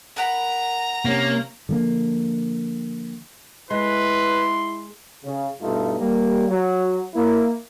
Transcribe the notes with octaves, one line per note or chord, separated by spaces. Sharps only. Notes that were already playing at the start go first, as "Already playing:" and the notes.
A#4 F#5 A#5 B5
C3 A#3 C#4
D3 F3 G#3 A#3
G#3 E4 B4 C6
C#3
G2 B2 A3 D#4 F4
G3 A#3
F#3
A#3 E4